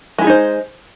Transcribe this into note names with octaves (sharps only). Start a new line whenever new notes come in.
G#3 D#4 E4 G#4 C5